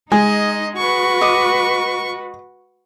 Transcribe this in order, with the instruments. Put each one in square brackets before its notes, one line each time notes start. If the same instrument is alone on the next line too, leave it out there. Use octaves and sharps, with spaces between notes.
[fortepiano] G#3 [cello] D#4 [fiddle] D#5 [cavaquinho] G#5
[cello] F#4 B4 [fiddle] C#6
[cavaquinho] D#5 D6